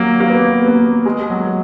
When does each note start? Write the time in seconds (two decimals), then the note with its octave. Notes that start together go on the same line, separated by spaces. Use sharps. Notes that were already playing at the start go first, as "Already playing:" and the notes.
Already playing: F#3 A#3
0.20 A#3
0.30 B3
0.62 B3
0.68 A#3
1.05 G#3
1.30 F#3